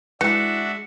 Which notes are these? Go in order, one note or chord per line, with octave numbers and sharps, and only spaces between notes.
E3 G#3 D4 F#4 E5 C#7